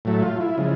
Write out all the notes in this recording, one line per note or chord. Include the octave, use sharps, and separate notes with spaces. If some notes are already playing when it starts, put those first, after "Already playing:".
A2 F#3 A3
F4
E4
C#3 F3 G#3